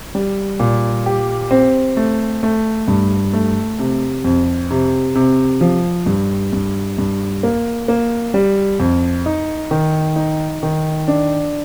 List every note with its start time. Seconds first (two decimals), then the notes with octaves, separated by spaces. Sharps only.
0.15 G3
0.60 A#2
1.06 G4
1.51 C4
1.97 A3
2.43 A3
2.88 G2
3.33 A3
3.79 C3
4.24 F2
4.71 C3
5.15 C3
5.61 F3
6.06 G2
6.53 G2
6.98 G2
7.43 A#3
7.88 A#3
8.34 G3
8.80 F2
9.26 D#4
9.71 D#3
10.16 D#4
10.63 D#3
11.08 D4